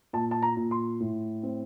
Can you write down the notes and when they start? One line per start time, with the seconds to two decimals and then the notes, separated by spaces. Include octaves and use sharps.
0.13 A#2 A5
0.31 A5
0.42 A#5
0.57 A#2
0.71 C6
1.00 A2
1.43 C4